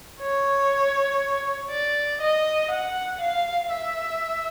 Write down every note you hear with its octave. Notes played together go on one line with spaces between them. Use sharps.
C#5
D5
D#5
F#5
F5
E5